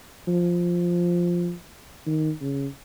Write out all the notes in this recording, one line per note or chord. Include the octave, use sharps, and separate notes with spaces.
F3
D#3
C#3